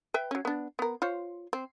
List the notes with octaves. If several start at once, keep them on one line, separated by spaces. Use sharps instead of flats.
B4 E5 G5
F#3 C#4
B3 D4
B3 A#4
F4 C5 C#5
C4